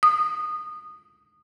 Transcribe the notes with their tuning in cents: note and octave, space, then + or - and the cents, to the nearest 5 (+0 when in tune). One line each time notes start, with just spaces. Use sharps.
D#6 -20